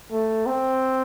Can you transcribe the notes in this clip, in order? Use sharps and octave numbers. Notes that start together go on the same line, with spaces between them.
A3
C4